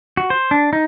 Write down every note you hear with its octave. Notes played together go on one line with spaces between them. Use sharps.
F#4
C5
D4
D#4